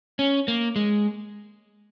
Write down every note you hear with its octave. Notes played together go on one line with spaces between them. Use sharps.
C#4
A#3
G#3